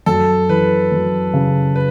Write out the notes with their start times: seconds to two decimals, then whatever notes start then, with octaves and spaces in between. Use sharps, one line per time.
0.06 F#2 A4
0.49 E3 B4
0.92 F#2
1.33 C#3
1.75 B4